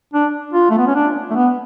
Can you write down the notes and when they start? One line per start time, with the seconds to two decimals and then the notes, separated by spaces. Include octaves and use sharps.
0.14 D4
0.53 F4
0.70 A3
0.78 B3
0.87 C#4
0.95 D4
1.31 A3
1.35 B3